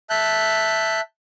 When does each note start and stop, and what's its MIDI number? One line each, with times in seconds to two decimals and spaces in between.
0.10 1.01 76
0.10 1.01 81
0.10 1.01 90
0.10 1.01 91